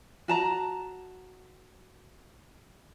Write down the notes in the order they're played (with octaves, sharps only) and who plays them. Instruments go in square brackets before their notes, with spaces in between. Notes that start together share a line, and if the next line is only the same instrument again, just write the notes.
[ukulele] F#4 A5 A#5